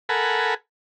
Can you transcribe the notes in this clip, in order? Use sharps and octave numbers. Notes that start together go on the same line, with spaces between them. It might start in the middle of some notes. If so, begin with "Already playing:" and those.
A4 A#4 F#5 G#5 B5